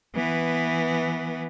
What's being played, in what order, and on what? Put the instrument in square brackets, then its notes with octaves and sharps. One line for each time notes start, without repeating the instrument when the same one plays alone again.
[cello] E3 B3